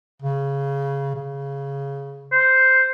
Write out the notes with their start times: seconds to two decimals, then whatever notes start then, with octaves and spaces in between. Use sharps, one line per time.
0.22 C#3
1.15 C#3
2.32 C5